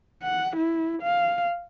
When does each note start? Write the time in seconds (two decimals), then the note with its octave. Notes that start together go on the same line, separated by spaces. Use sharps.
0.23 F#5
0.57 E4
1.03 F5